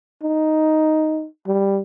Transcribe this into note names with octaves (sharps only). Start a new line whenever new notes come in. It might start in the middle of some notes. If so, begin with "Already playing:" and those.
D#4
G3